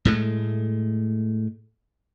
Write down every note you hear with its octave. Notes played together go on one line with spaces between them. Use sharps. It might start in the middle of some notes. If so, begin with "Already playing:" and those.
A2 G#3 A3